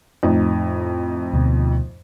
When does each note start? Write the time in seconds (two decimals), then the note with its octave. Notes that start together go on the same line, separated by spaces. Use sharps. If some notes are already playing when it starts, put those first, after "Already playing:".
0.23 F2 A2 D#4
1.33 D2 B2